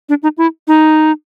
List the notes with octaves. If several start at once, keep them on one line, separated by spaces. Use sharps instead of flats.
D4
D#4
E4
D#4